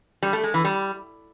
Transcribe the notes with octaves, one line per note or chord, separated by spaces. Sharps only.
G3
A3
G#3
E3
G3